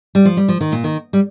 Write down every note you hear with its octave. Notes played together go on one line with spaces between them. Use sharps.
G3
F3
G3
F3
D#3
A#2
D#3
G3